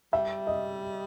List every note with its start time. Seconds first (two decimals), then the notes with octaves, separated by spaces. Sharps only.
0.13 G3 E5
0.47 D#5